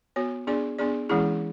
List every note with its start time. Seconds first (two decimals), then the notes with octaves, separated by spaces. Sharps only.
0.16 B3 F#4 C#5
0.47 B3 D4 G#4 D5
0.78 B3 D4 G#4 D5
1.09 E3 G#3 C#4 E4 G#4